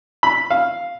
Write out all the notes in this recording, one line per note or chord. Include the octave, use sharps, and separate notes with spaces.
B5
F5